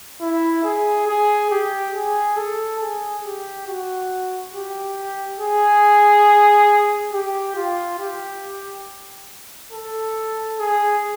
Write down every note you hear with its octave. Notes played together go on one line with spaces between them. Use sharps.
E4
G#4
G#4
G4
G#4
A4
G#4
G4
F#4
G4
G#4
G4
F4
G4
A4
G#4